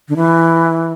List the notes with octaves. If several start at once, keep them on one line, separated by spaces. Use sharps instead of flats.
D3
E3